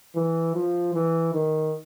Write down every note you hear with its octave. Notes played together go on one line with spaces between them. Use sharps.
E3
F3
E3
D#3